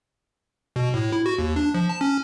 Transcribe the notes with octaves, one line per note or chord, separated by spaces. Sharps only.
B2
A2
E4
F#4
D#2
D4
F3
A5
C#4